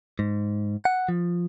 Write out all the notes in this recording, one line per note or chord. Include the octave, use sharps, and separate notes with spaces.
G#2
F#5
F3